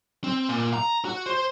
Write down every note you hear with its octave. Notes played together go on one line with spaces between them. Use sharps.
C4
A#2
A#5
F#4
C5